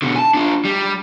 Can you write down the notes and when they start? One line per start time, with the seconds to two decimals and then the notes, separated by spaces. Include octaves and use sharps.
0.02 B2 D3
0.16 G#5 A5
0.34 D4 F4
0.65 G3